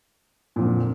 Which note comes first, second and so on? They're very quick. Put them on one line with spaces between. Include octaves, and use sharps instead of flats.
A#2 F2 D3